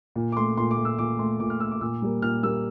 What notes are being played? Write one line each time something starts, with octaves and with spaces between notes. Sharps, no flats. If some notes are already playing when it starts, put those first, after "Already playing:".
A#2
D6
A3 C6
A#2 C6
D6
A3
E6
A#2 D6
A3 C6
A#2 D6
F6
A3 E6
D6
A#2 E6
G3 A#3
A#2 F6
G3 A#3 E6